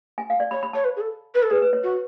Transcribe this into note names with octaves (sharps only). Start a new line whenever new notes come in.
G#5
F5
D5
C#5 B5
B5
C#5 A5
B4
G#4
A4
B4
A4
G#4 B4
B4
C#5
F#4